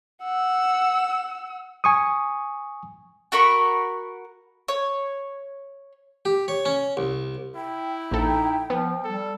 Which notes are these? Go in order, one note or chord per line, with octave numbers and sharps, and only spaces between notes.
F#5 E6
G#5 C#6 D#6
F#4 A#4 B5 C#6
C#5
G4
C#5
C#4
C2
E4 G5
A#1 D#4 A4
F3 B3
G3 A4